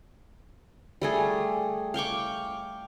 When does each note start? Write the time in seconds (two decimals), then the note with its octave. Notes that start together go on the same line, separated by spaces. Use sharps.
1.02 G3 A3 G#4
1.94 F5 G5 C#6 D6